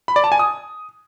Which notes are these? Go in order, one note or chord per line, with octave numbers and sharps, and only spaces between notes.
B5
D5
A5
G#5
D#6